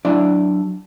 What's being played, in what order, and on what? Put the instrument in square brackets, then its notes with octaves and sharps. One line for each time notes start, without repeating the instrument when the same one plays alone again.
[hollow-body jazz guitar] F#3 D4 E4 D5